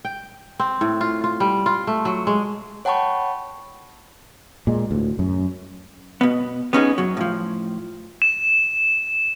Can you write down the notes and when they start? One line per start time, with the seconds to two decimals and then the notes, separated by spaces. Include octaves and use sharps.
0.05 G5
0.59 C4
0.81 A2
1.01 F4
1.24 F4
1.40 G3
1.66 F4
1.87 A3
2.05 F#3
2.27 G#3
2.85 C#5 F#5 G5 A5 B5 C#6
4.67 A#2 G#3
4.91 D2 A2
5.19 F#2
6.21 B2 B3
6.73 B3 C#4 D#4 G#4
6.98 F#2 F#3
7.17 A2 F3
8.22 E7